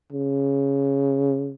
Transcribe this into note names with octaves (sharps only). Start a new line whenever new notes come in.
C#3